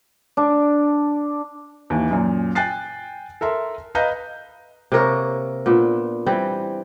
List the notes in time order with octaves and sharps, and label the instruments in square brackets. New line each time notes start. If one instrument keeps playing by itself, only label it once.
[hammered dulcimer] D4
[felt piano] D#2 E3
F#2 A#2
G5 G#5 F#6 A6 C7
A4 A#4 E5 C6
B4 D#5 F5 A#5 G6
[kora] C3 A#3 A#4 C#5
A#2 B3 D4
E3 G3 C4